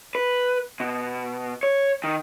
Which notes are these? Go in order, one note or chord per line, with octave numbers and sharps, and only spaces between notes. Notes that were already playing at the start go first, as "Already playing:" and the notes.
B4
B2
C#5
D#3